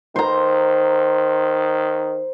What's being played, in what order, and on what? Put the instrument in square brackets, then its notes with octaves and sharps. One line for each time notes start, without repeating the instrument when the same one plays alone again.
[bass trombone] D#3 [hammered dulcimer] C5 A#5